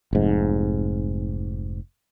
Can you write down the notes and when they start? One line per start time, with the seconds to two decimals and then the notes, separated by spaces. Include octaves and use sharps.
0.13 F1 G#2